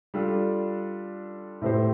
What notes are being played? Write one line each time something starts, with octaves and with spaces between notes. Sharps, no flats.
G3 D4 F4 A4
A2 A3 C4 G4 C5